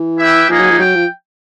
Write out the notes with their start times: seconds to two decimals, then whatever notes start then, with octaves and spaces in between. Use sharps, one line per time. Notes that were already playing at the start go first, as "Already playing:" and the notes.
Already playing: E3
0.20 E4 G4 B4 E5
0.49 F3 A#3 D#4 G#4
0.59 F#3
0.70 F3
0.79 F#3 G5
0.95 F3